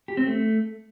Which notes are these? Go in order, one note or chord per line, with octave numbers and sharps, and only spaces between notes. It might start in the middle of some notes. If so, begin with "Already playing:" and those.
G4
C4
A3